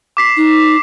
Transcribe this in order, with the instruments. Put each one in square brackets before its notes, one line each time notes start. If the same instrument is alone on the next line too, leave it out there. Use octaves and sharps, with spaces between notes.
[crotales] D6 B6 C7
[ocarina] D#4